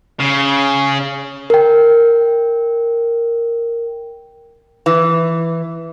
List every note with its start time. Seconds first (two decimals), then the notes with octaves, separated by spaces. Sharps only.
0.20 C#3
1.50 A#4 G5
4.86 E3